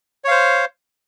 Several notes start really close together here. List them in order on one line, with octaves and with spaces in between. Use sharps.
C#5 F5 C5